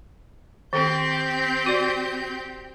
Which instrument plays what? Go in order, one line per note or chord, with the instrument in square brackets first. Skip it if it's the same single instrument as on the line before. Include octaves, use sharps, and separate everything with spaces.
[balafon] D#3 [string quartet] C4 G4 G6
[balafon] F#4 D5